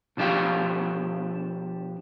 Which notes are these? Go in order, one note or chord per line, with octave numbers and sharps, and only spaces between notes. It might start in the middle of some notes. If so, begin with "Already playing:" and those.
B2 F3 D4 G4 F5